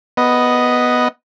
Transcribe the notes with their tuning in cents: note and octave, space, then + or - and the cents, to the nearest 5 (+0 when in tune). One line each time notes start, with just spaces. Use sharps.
B3 +0 B4 +0 D#5 +0